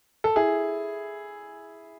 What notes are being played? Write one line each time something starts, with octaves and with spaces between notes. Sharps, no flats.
A4
E4 G#4